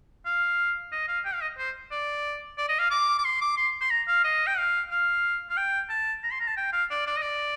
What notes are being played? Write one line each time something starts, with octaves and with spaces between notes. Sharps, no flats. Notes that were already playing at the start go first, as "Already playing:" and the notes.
F5
D#5
F5
G5
F5
D#5
C5
D5
D5
D#5
F5
D6
D6
C6
D6
C6
C6
A#5
F5
D#5
G5
F5
F5
F5
G5
A5
A#5
C6
A#5
A5
G5
F5
D5
D5
D#5
D5